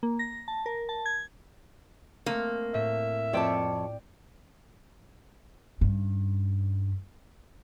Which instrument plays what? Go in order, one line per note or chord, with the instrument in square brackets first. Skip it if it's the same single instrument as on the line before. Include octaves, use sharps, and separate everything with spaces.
[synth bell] A#3
A#6
A5
A#4
A5
G#6
[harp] A3 C4 [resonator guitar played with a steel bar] A#3
[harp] A2 [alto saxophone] E5
[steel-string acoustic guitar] F2 C#5 A5 [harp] D5 G5 D6
[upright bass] G2 C#4